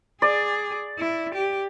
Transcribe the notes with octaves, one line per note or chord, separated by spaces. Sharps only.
G#4 D5
E4
G4